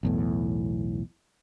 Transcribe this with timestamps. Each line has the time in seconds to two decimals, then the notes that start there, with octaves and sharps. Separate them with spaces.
0.03 B1 E2 A2